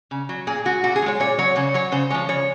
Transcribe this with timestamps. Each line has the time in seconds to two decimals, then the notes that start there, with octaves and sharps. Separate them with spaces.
0.11 C#3
0.29 F#3
0.47 A#2 G#4
0.65 G#3 F#4
0.84 A#2 F#4
0.96 G#4
1.02 F3
1.06 G#3 C#5
1.20 A#2 C#5
1.38 F#3 C#5
1.56 C#3 C#5
1.74 F#3 C#5
1.92 C#3 C5
2.10 F3 G#3 C#5
2.28 C#3 C#5